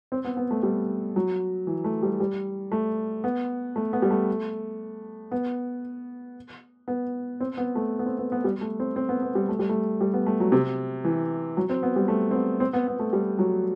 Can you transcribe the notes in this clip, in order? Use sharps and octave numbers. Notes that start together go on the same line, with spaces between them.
C4
B3
B3
A3
G3
F#3
E3
A3
G3
G3
A3
B3
A3
B3
G3
A3
B3
B3
C4
B3
A3
B3
C4
B3
B3
G3
A3
C4
C4
B3
B3
G3
A3
G3
A3
G3
B3
A3
F#3
C3
E3
F#3
C4
B3
G3
A3
C4
B3
C4
B3
B3
A3
G3
F#3